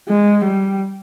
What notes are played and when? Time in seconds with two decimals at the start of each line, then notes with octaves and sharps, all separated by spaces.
0.09 G#3
0.45 G3